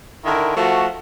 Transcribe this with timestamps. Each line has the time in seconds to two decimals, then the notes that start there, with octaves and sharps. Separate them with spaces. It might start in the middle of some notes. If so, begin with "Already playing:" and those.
0.25 D3 D#3 E4 A#4
0.56 F3 A3 F#4